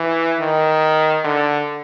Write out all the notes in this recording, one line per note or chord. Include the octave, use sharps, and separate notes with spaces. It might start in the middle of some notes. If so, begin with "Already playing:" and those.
Already playing: E3
D#3
D3